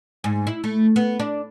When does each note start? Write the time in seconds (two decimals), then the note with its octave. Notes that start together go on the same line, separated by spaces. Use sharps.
0.24 G#2
0.47 E4
0.64 A3
0.96 B3
1.19 D4